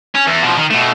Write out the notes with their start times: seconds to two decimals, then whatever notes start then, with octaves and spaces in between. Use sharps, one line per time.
0.15 C#4
0.27 E2
0.42 B2 F3
0.57 D#3
0.70 B2 A3